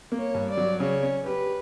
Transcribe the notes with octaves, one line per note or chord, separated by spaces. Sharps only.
A#3
C#5
G2
D5
F#3
C#3 C#5
C#4
G4 B4